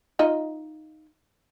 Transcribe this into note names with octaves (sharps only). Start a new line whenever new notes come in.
D#4 F4 D#5